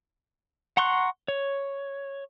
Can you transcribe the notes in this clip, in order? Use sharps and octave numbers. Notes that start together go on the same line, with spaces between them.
F#5 A#5 C6 C#6 F#6
C#5